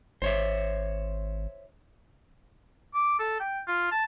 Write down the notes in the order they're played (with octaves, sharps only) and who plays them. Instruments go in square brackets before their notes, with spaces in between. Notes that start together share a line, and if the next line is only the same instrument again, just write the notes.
[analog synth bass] G#1 [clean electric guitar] C5 C#5 E5
[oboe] D6
A4
G5
F4
A5